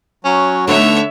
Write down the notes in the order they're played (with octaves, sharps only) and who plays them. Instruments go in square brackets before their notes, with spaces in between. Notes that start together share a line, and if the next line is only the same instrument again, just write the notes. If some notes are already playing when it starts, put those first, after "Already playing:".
[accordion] F#3 [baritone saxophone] C#4
[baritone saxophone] D3 [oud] A3 B3 D#4 [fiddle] C#5 E5